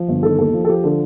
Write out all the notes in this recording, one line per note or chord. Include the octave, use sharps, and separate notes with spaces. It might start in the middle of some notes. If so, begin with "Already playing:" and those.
Already playing: F3
G1
D#3 A4
D#2 A4
F3
A4
F3 G4
D3 A4